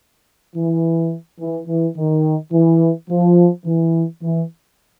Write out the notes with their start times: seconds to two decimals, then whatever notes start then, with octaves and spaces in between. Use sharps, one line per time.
0.56 E3
1.40 E3
1.68 E3
1.97 D#3
2.53 E3
3.10 F3
3.66 E3
4.23 E3